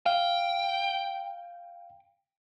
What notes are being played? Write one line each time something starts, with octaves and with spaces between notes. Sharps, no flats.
F5 G5